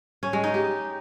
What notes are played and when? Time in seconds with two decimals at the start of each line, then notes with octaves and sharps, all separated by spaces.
0.23 C#4
0.33 G#3
0.44 D#4
0.54 G4